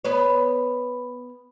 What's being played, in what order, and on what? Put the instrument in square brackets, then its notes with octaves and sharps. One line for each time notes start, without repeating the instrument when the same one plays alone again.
[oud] B3 B4 C#5